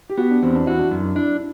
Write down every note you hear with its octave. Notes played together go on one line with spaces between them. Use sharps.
G4
B3 F#4
D4
E2 C4
D4
E4 F#4
D4
F#2
D4
D4 E4